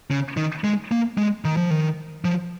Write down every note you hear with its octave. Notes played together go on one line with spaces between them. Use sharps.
C#3
D#3
G#3
A#3
G#3
D#3
F3
D#3
F3